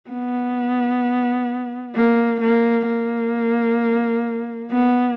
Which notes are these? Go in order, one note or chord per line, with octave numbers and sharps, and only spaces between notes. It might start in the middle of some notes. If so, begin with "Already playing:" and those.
B3
A#3
A#3
A#3
B3